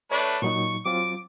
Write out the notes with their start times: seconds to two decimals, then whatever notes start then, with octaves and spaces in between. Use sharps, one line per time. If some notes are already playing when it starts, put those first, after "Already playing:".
0.12 A3 D4 B4 C#5 D5
0.42 A#2 F#3 D#4 C#6
0.85 F#3 C4 F4 D6